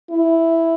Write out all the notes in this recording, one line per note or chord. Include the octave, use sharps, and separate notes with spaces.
E4